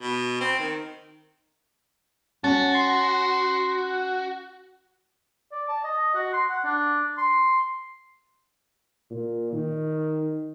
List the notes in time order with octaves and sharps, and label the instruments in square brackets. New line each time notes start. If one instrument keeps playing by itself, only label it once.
[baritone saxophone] B2
C4
D#3
[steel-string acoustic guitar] C#4 [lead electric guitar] F#4 [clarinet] A5
[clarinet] C6
[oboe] D5
A5
D#5
F#4
C6
F#5
D4
C6
[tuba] A#2
D#3